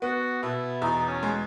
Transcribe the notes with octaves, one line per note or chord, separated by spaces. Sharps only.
B3 F#4
B2 E4
E2 D#4
C#4
G#3